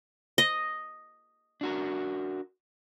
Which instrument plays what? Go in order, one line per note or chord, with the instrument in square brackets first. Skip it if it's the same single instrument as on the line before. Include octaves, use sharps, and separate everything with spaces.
[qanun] D#5
[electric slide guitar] D4 F#4 A#4